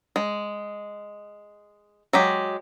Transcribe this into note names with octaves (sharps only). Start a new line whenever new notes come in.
G#3
F#3 G#3 G4